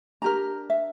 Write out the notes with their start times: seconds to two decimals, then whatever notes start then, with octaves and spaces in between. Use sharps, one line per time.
0.22 D4 G4 A#4 A#5
0.70 E5